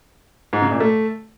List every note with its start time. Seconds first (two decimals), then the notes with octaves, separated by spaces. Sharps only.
0.53 G#2
0.62 C#3
0.71 A#2
0.80 A3